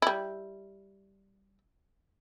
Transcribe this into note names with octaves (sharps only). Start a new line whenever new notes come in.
G3 E4